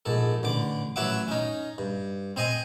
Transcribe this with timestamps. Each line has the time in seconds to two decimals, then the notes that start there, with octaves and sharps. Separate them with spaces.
0.06 A#1 G#2 A4
0.43 A1 D3 D6
0.96 A1 F#3 C#5 E5 F#5 D6
1.28 C#4 D#4
1.78 G2
2.36 C4 C5 D#5 G#5